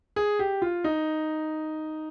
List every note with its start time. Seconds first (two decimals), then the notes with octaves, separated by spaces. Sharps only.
0.16 G#4
0.39 G4
0.62 F4
0.84 D#4